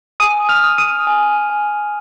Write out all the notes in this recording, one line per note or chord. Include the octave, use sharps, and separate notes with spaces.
G#5 D#6 D#7
F6 F7
D#6
D#6 D#7
G#5
G#5